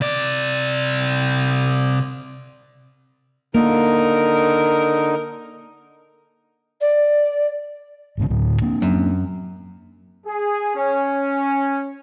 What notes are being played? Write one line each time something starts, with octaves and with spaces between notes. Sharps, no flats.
C3 D5
D3 A#3 D#4 A#4
D5
A1 G#2 C#3
D2 A2 F#3
A#3 C4 D4
F#2
G#4
C#4